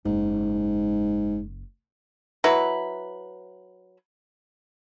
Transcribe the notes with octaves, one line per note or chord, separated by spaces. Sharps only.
F#1 G#2 C#3
F#3 E4 B4